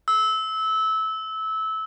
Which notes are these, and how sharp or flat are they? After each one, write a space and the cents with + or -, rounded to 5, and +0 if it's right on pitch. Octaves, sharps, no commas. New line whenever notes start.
E6 -20